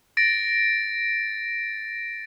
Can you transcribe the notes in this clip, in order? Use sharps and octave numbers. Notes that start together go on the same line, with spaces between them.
A6 A#6 D7